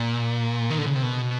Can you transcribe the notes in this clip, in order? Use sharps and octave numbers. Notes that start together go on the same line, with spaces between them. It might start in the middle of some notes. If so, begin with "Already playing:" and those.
Already playing: A#2
D#3
D3
C#3
C3
B2